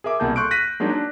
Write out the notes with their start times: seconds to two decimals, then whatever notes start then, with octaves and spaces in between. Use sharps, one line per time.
0.04 G#4 A#4 E5 D6
0.20 C2 B2 A#3 G#4 A5 G6
0.36 A4 C6 C#6 F#6 G6 D7
0.51 F#6 A#6 B6 D#7
0.80 F#3 G#3 A#3 D4 D#4
0.92 D4